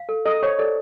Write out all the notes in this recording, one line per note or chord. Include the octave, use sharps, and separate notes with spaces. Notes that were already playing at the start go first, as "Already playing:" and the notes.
Already playing: F5
A4
A4 D#5
C5 C#5
A4 D5